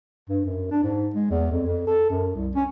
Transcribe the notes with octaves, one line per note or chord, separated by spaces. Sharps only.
G2
F#2
D4
G#2
G#3
E2
F2
F2
A4
F#2
C2
C#4